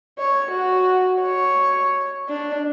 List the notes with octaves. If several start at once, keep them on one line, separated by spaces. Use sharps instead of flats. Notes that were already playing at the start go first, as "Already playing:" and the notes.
C#5
F#4
C#5
D4